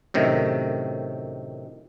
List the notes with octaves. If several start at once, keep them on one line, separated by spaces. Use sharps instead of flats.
F#2 A2 C3 D#3